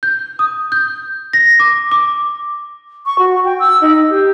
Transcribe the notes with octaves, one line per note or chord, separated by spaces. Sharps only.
G6
D#6
G6
A#6
D6
D6
C#6
F#4
G5
E6
D#4
G4